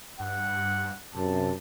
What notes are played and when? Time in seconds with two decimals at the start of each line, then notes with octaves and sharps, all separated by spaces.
0.20 G2 F#5
1.15 F#2 C3 A5